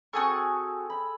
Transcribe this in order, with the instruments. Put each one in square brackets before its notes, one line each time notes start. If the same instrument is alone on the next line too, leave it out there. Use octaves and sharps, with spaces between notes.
[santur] C4 G#4 A4 [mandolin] F#4 G#5 C#6
[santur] B5